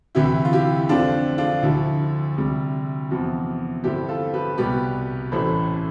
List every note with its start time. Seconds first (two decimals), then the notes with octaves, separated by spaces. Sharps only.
0.15 D2 C3 E3 E4 G4
0.45 F4
0.53 E4 G4
0.89 F2 D3 A3 C4 D4 F4
1.38 D4 F4
1.63 D2 D3 F3 E4
2.37 D2 C3 G3
3.10 E2 C3 F3
3.84 G2 D3 A3 C4 E4 G4
4.09 F4 A4
4.33 G4 B4
4.57 C2 B2 G3 B3 G4 B4
5.31 A1 A2 E3 A3 A4 C5